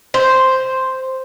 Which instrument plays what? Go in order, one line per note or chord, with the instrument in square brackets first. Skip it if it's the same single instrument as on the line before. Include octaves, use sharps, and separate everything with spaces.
[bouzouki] C5